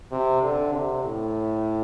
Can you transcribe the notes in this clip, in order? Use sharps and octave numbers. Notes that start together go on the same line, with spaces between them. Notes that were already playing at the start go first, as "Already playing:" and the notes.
C3
D3
C3
A2